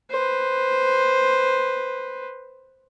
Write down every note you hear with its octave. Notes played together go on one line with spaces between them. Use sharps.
B4 C5